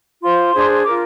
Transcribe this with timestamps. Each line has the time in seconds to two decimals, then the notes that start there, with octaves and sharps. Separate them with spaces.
0.22 F4 C5 C6
0.54 D4 G#4 C5
0.84 F4 A#4 D6